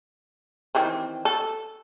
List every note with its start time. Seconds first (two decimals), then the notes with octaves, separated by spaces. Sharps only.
0.75 D#3 E3 C4
1.25 A4